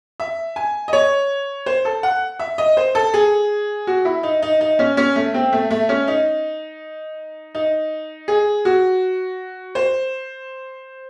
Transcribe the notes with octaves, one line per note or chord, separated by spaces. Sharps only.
E5
G#5
D#5
C#5
C5
A4
F#5
E5
D#5
C5
A4
G#4
F#4
E4
D#4
D#4
D#4
C#4
C#4
A3
C4
A3
A3
C#4
D#4
D#4
G#4
F#4
C5